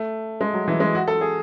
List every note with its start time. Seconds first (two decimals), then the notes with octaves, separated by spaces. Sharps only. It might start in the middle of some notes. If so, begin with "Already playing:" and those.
Already playing: A3
0.41 G#3
0.53 F#3
0.68 E3
0.80 G#3
0.95 F#4
1.08 A4
1.21 G#4